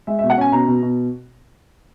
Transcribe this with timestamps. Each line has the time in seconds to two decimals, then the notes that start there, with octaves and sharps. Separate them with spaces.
0.07 G#3 E5
0.19 E5
0.23 B2
0.30 F#5
0.38 C#4 G#5
0.52 B2 A#5
0.68 B2
0.82 B2